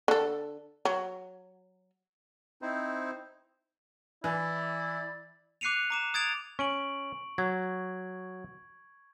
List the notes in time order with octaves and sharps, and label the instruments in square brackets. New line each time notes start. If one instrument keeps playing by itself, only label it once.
[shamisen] D3 A4
F#3
[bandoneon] C4 D#4 E4 C5
[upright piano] E3 [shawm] E4 [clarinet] D5
[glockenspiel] D6 F#6 C7 C#7 D#7 F7
A#5 D6 E7
D#6 G#6 A6 D7 F7
[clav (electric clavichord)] C#4 [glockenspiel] C#6 D7 F#7
[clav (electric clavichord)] F#3 [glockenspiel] G#6